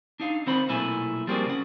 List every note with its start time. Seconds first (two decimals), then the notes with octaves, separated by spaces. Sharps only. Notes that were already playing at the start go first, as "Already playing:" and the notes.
0.20 D4 D#4 F5
0.46 D#3 C4 C5 F#5 B5
0.68 B1 A#2 A3 E4 G#5
1.27 F3 G3 A#3 C4 F#4 G#4
1.46 C#3 F#5